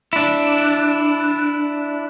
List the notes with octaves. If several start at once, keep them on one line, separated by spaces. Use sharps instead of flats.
D4 E4